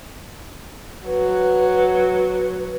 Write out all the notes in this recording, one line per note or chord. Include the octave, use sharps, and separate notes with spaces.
F#3 B4